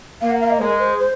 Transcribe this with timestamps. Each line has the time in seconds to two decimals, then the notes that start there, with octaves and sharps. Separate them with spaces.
0.21 A#3 F5
0.30 F#5
0.40 F5
0.50 D#5
0.60 G#3 A#4
0.79 C5
0.98 C5